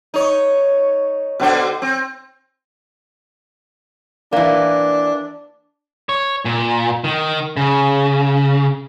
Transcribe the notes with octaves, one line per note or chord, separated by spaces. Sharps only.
D#4 C#5
B2 D3 C5
C4
E3 A#3 D4
C#5
A#2
D#3
C#3